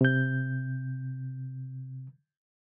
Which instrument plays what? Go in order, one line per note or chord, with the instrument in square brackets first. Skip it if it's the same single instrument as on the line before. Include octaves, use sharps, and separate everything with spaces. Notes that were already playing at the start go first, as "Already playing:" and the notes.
[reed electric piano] C3 G6